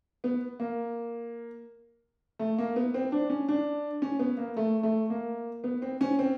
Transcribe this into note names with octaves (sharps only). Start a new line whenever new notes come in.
B3
A#3
A3
A#3
B3
C4
D4
C#4
D4
C#4
B3
A#3
A3
A3
A#3
B3
C4
C#4
C4